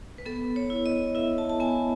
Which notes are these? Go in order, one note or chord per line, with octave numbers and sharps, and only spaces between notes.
B4
B3 A4
C#5
E4
D#5
E4 E5
A5
A5
B3 G#5